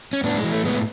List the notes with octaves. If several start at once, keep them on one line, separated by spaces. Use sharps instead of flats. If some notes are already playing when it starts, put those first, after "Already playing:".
C#4
A2 B3 D4
G#3
E3
A3
A2 G#3 B3